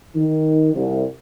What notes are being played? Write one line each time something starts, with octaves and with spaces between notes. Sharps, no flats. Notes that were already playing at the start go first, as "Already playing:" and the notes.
D#3
C2